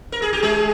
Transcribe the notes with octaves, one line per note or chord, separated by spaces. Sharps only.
A#4
G#4
G4
G#3 G#4